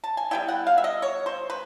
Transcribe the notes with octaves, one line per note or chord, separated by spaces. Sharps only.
A5
G#5
G3 B3 E4 G5
F#5
F5
E5
D#5
C#5
C5
B4